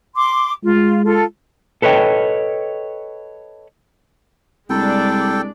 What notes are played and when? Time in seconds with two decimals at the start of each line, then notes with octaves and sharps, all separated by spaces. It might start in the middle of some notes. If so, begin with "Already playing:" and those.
0.16 C6 D6
0.64 G#3 F4
1.05 F4 A4
1.82 A4 B4 C#5 D#5 G5
4.70 C2 G#3 D4 A4 D5 G5